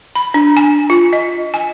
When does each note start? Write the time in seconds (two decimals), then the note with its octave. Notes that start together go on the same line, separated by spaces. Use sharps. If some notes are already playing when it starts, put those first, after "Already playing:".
0.15 B5
0.34 D4
0.57 G#5
0.90 F4
1.13 D#5
1.54 G#5